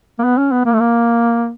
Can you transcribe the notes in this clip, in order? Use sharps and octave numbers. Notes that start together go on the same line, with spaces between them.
A#3
B3
C#4
B3
A#3
A3
A#3